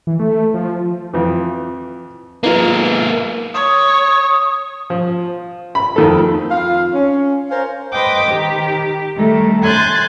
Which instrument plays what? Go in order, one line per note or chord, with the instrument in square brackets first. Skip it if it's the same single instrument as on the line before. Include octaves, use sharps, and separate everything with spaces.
[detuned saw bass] E3
A3
F3
[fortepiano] F2 E3
[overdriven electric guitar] G#3 A#3 [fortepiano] B3 D#4 F4
[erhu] C#5 [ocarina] D#6
[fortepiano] F3
B5
F2 D#3 A4
[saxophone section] F2 F4 F5
C#4
C#4 A#4 C5 F5
[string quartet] B4 C5 D#5 G5 D6 D#6
D#3 G4
D#3 G3 A3
G#5 C6 F#6 G6 A6